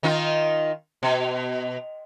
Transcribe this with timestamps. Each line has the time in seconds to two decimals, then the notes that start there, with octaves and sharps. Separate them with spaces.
0.03 D#3 D#4 F4
1.03 B2